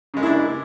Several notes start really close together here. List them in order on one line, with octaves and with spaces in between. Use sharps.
C#3 G#3 A#3 E4 D4